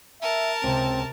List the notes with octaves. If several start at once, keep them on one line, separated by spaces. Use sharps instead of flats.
A#4 E5 A5
C#2 C3 C4